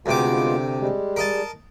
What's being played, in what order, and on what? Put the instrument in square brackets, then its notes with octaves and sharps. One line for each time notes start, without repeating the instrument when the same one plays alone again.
[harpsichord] D2 C3 D6 [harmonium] G#3 B3 F4
[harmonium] G3 G#3
[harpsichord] A#4 D#5 A5